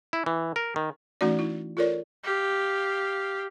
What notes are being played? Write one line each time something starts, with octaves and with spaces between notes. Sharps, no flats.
E4
E3
A#4
D#3
E3 A3 C#4 D#4 F#4 D5
E4
F4 A4 A#4 C#5 D5
G4 F5